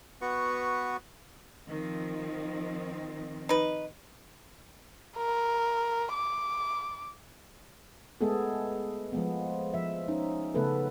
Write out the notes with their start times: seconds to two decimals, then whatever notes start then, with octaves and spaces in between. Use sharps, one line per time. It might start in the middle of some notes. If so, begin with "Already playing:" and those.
0.21 B3 F#4 B4 C#6
1.68 D#3 F3 C4
3.49 D#4 B4
5.17 A#4
6.14 D6
8.21 G#3 A3 B3 G#4 A4
9.13 F3 G#3 B3
9.74 F3 E5
10.08 C#4 D#4
10.55 C#3 A3 B3 A4 B4